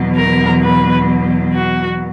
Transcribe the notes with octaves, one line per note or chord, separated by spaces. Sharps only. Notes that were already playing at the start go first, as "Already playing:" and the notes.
Already playing: E2 B2 F#3
A#4
B4
F#4